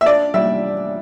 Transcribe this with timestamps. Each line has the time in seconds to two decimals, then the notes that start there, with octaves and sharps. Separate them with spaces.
0.01 E5
0.06 D4 D5
0.34 G3 E5